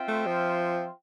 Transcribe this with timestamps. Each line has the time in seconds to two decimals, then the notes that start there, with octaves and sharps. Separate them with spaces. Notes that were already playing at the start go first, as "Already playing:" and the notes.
Already playing: C4 F4 C5 E5 G5
0.08 A3
0.26 F3